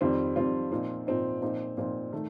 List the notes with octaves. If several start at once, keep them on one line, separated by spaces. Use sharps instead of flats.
F2 D#3 G3 C4 F4
F2 D#3 G3 C4 F4
A#2 F3 C4 D#4
A#2 F3 C4 D#4
A#2 F3 C4 D#4
A#2 F3 C4 D#4
D#3 A3